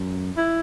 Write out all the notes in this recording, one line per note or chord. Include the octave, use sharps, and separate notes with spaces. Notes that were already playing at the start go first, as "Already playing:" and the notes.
Already playing: F#2
E4